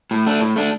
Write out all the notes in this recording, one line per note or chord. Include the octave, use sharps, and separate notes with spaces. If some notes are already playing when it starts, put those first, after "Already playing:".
A2
A3 D4
A2
A3 D4